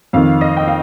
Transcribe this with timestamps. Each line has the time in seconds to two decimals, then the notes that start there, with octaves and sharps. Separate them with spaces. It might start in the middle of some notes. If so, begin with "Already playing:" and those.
0.13 F2 D#3 F5
0.41 D#5
0.57 G5
0.68 F5